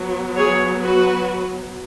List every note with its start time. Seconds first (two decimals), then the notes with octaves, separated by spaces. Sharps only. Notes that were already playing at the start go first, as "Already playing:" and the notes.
Already playing: F#3 B3
0.37 G#4 C#5
0.82 F#4 B4